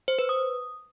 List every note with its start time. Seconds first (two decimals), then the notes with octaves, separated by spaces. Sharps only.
0.08 C5
0.19 B4
0.29 D#6